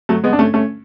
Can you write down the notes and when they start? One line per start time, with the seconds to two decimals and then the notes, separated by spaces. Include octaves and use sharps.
0.09 F#3 A3
0.24 G#3 B3
0.33 D4
0.39 A3 C#4
0.54 A3 C#4